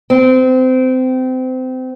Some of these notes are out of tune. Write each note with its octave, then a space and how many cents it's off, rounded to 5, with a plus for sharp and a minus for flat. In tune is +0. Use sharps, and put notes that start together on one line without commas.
C4 -25